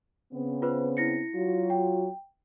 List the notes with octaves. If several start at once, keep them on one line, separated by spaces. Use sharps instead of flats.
C#3 B3 C4
F4 B4 C5
E4 A#6 C#7
F#3 F4 F#4
G5